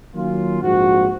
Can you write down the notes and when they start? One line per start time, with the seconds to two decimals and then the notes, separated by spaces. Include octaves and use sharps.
0.13 D#3 F#3 A#3 C#4 F4
0.60 A#1 G#2 F3 C4 F#4